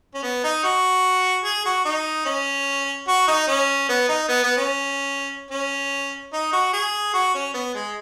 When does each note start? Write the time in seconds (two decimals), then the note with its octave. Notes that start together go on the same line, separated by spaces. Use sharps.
0.14 C#4
0.23 B3
0.44 D#4
0.64 F#4
1.44 G#4
1.65 F#4
1.85 D#4
2.26 C#4
3.07 F#4
3.28 D#4
3.48 C#4
3.89 B3
4.09 D#4
4.29 B3
4.43 B3
4.57 C#4
5.51 C#4
6.33 D#4
6.53 F#4
6.73 G#4
7.14 F#4
7.34 C#4
7.54 B3
7.75 G#3